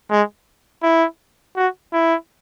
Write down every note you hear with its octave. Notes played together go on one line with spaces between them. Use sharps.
G#3
E4
F#4
E4